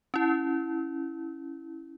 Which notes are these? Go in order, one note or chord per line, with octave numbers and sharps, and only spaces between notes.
C#4 E4